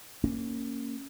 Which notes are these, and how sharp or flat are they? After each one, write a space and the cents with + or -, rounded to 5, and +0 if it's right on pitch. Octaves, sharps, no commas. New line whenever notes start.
A#3 -20 C#4 -5